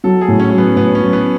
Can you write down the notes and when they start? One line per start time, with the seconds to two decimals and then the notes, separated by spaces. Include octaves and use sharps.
0.04 F#3 A4
0.21 G#4
0.28 A2
0.40 C#4
0.50 F#3 C#4
0.58 B3
0.76 A2 B3
0.95 C#4
1.00 F#3
1.13 B3